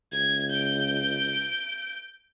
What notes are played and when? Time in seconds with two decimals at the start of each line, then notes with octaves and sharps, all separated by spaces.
0.12 C#2 G#6
0.51 G6 D7